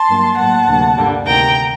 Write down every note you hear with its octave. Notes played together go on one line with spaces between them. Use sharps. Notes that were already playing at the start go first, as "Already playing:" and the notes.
Already playing: A5 C6
G2 F#3 A#3
A2 F#3 A#3 F#5 A5
D2 C3 F#3 A#3
G2 D3 G3 A#3
D2 C3 D#3 G5 A#5